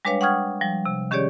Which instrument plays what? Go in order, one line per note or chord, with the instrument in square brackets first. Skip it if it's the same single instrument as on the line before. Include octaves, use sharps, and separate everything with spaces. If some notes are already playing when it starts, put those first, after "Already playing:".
[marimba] G3 G#3 D4 B4 C#5 F5
F#5 G5 C#6 D#6 F6 G#6
F3 G3
C3
D#3 C#4 G4 G#4 C#5 D5